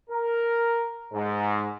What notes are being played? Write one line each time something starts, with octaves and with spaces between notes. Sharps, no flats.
A#4
G#2